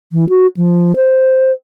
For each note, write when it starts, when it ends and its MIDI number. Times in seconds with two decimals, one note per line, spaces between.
0.12 0.28 52
0.29 0.47 66
0.57 0.96 53
0.96 1.52 72